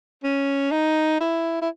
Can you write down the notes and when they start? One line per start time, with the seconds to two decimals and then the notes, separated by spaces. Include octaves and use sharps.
0.24 C#4
0.71 D#4
1.20 E4
1.62 E4